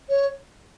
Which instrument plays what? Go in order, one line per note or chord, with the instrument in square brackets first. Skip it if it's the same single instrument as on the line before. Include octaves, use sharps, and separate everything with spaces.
[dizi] C#5